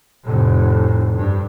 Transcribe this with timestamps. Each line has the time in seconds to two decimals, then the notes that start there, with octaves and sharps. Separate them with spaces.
0.23 F1 A2
1.16 G2